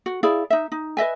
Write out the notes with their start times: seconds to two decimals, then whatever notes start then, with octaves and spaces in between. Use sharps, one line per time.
0.06 F#4
0.23 E4 G#4 D5 F5
0.50 D#4 E5
0.72 D#4
0.97 B4 D#5 E5 G#5